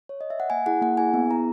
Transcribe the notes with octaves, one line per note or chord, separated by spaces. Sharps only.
C#5
D#5
E5
F#5
A#3 G#5
E4 G#4 F#5
A#3 F#5
E4 G#4 G#5
B3
E4 G#4 A#5